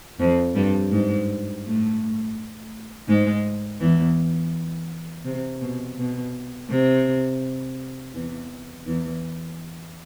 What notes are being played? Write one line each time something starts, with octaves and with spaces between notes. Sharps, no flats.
F2 F3
G2 G3
G#2 G#3
A2 A3
G#2 G#3
E2 E3
C3
B2
B2
C3
E2 E3
E2 E3